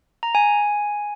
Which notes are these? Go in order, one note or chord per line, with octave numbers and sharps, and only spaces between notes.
A#5
G#5